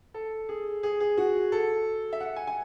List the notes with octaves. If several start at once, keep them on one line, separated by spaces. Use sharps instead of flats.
A4
G#4
G#4
G#4
F#4
A4
E5
F#5
G#5
G#5